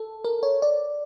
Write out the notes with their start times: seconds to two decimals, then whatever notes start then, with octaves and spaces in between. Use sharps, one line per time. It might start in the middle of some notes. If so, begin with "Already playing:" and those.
Already playing: A4
0.25 A#4
0.43 C#5
0.62 D5